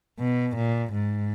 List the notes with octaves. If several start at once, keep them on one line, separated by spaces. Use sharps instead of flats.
B2
A#2
G#2